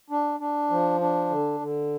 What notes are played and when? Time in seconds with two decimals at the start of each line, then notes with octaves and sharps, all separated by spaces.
0.10 D4
0.40 D4
0.70 F3
1.01 D4
1.30 D3
1.60 D3